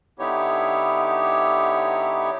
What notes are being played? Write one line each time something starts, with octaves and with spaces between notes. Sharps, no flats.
D3 B3 D#4 E4 G4 C#5